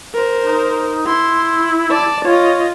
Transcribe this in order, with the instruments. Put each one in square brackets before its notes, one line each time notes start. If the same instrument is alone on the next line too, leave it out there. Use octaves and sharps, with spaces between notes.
[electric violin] A#4 C5
[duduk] D#4
[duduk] E4 [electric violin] C6
[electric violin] D5 A5
[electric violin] F4 D#5 [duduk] C#5